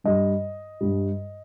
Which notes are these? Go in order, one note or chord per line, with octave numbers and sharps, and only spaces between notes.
G2 G3 D#5
G2 G3